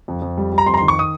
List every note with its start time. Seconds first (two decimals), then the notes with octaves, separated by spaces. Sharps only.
0.08 F2
0.22 F2
0.37 G3
0.52 G3
0.58 A#5
0.66 F2 C6
0.74 A#5
0.77 D#3 C6
0.88 C#6
0.99 D#6